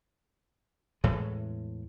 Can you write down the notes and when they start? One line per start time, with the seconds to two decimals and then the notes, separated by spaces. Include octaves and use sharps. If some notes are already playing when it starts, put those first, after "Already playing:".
1.04 E2 A2 G#3